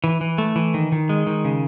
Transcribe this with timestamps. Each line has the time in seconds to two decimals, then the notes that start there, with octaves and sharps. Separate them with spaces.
0.04 E3
0.21 E3
0.38 A3
0.56 E3
0.74 D#3
0.92 D#3
1.09 G#3
1.27 D#3
1.45 C#3